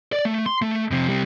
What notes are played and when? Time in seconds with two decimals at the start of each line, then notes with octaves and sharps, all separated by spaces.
0.13 D5
0.25 A3
0.46 C6
0.62 A3
0.91 F2 C3
1.08 C3 G3